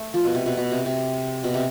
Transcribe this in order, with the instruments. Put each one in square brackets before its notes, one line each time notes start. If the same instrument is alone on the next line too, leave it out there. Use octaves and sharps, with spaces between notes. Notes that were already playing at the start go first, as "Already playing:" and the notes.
Already playing: [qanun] A3
F3
B2
C3
B2
B2
C3
C3
B2
C3